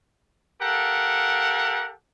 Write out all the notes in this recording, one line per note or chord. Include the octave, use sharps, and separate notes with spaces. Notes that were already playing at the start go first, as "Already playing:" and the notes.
G4 A4 A#4 F5 F#5